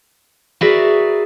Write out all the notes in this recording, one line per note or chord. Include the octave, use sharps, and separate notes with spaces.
F#4 G#4 A#4 B4 D5 E5